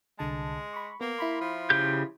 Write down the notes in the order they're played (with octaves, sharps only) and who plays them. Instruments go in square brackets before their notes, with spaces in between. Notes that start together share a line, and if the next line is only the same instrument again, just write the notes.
[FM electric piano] C2 D3 A5 [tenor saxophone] G#3
[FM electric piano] B5 C#6
[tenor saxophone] A#3 [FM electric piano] B3
[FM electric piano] E4 B5 C6
[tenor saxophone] F3
[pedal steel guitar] C#3 G4 G6